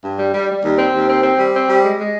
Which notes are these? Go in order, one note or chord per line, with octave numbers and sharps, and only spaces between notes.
G2
G3
G3
G3
D#2
C4
D#2
C4
C4
G3
C4
G3
G#3
G#3